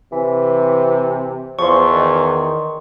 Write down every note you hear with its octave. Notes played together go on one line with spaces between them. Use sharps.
C3 E3
E2 F3 C6 C#6
D#3